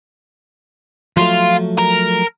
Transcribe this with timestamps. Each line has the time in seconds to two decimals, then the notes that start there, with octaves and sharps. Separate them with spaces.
1.17 F3 F#3 A3 F4
1.78 A#4